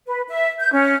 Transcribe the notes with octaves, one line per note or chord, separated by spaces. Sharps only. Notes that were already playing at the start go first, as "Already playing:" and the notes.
B4
E5
G6
C#4